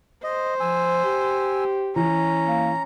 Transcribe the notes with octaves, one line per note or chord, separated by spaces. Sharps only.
C5 D#5
F3 G#5 E6
G4
E3 C#4 A#5
A#3